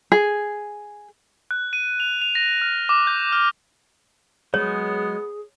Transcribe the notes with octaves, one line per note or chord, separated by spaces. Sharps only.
G#4
F#6
D#7
F7
F7
A#6
F6
D6
G6
F6
F#3 G#3 B3 G#4 C#5